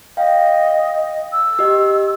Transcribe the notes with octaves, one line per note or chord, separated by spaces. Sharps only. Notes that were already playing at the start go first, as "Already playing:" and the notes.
D#5 F5 G5
E6
G4 D#5